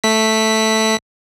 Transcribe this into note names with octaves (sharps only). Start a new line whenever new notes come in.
A3 B6